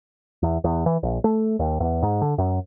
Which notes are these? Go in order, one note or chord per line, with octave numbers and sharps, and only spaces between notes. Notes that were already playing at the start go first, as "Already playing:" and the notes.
E2
E2
E3
A#1
A3
D#2
E2
G#2
D3
F#2